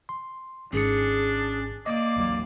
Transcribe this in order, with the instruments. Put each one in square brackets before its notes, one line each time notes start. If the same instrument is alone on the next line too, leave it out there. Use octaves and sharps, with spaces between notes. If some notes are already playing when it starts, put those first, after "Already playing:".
[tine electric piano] C6
[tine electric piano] G#1 G#2 C#7 [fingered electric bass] C#4 [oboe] D4 [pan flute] G#4
[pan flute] A#3 [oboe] D5 [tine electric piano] D#5 D6
[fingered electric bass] A1 D#2 F#3